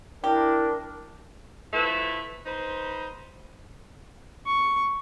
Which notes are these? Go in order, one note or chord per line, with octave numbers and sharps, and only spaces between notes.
D4 E4 G4 A#4
F3 A3 E4 B4
D#4 B4 C5
C#6